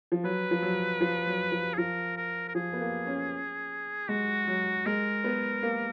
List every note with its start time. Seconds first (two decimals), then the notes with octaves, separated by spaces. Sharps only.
0.12 F3
0.24 F#3 B4
0.51 F3
0.62 F#3
1.01 F3
1.27 F#3
1.52 F3
1.74 G#4
1.78 F3 A#4
2.17 A#4
2.48 A#4
2.55 F3 G#4
2.73 B3
2.81 A#3
3.07 C#4
4.08 G#3 F#4
4.47 F#3
4.86 G#3 A#4
5.24 B3
5.63 A#3